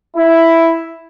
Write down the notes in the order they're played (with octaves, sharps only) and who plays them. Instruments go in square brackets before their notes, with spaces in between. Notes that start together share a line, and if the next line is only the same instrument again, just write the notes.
[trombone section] E4